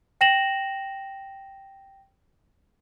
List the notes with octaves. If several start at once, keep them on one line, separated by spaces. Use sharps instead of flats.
G5 A#6 E7 F#7